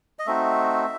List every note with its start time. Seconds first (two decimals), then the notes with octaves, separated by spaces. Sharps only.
0.19 D#5
0.26 A3 C4 D#4 F#4 E5